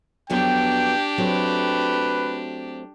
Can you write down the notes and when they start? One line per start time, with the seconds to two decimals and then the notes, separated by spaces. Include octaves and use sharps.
0.30 F2 F#3 B3 D4 G4 G5
1.18 F#3 A3 C4 B4